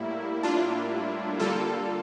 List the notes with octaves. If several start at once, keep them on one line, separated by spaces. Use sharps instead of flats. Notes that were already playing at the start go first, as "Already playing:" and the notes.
Already playing: A2 G3 A#3 E4
D4 F4
D3 G3 A#3 F4 A4